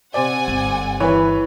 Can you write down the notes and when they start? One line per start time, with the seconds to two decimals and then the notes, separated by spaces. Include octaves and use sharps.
0.14 C3 C5 D5 F#5 G#5
0.47 G1 C4
1.00 E3 B4 C#5